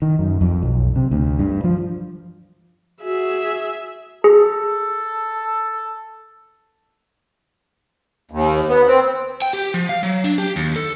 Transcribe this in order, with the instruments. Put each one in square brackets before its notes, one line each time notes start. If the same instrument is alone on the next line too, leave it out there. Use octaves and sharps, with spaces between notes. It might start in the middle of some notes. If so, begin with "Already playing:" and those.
[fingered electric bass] D#3
F#2
F2
B1
C3
D2
G2
F3
[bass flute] F#4 [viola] G#4 E5
[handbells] G#4 [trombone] A4
[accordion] D#2
B3
C4
[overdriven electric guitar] G5
G4
F3
F5
F#3
D4
G4
D#2
A4